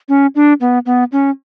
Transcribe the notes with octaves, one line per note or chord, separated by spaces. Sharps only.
C#4
D4
B3
B3
C#4